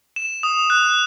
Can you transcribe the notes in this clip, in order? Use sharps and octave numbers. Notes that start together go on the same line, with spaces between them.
E7
D#6
F#6